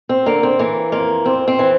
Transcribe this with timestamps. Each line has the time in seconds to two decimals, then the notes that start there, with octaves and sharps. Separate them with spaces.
0.09 C4
0.26 D3 A#3
0.43 C4
0.59 E3 A#3
0.92 F2 A#3
1.25 F2 C4
1.48 C4
1.59 E3